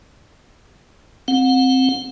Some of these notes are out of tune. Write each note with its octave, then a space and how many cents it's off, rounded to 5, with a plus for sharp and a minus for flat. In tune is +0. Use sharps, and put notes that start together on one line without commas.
C4 +0 F#5 -30